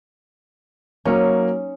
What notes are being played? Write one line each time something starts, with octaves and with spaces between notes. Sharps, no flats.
F#3 A#3 C#4 D#4